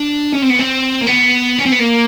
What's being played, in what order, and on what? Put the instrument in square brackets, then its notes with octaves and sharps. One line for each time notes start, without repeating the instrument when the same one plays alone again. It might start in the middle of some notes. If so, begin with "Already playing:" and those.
Already playing: [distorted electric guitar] D4
C#4
C4
B3
C4
A#3
B3
C#4
C4
B3
A#3